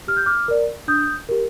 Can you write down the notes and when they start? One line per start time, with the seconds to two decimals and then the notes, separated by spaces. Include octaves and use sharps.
0.08 G4 F6
0.17 G6
0.26 D6 F6
0.48 A#4 D5
0.88 D4 D#6 G6
1.29 G4 A#4